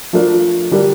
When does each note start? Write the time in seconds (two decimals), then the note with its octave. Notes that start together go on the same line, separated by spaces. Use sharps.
0.13 F3 A3 D4 F4 A#4
0.71 D3 G3 D4 G4 A#4